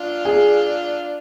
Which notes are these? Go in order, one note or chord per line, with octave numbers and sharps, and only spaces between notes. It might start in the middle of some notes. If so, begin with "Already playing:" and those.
Already playing: D4 F4
G#4